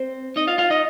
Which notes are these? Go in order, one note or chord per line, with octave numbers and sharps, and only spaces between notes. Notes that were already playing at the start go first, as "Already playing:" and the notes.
Already playing: C4 C5
D#4 D#5
F4 F5
F4 F5
D#4 D#5